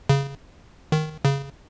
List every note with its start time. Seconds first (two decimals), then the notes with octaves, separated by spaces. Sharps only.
0.09 C#3
0.92 D#3
1.25 C#3